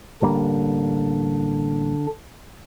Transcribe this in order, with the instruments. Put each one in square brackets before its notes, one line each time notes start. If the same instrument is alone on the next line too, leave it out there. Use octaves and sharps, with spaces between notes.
[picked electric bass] A1 G3 A#3 [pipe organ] D3 D4